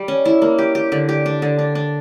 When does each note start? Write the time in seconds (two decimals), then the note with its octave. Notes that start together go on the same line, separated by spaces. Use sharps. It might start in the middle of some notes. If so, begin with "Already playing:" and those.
Already playing: G3
0.08 C#4
0.25 E4
0.42 A#3
0.58 G4
0.75 G4
0.92 D3
1.09 G4
1.26 D4
1.42 D3
1.59 D4
1.75 D4